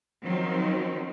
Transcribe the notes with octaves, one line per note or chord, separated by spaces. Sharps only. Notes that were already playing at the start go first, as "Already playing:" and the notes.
D#3 F3 F#3 C4